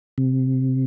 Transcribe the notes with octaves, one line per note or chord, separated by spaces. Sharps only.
C3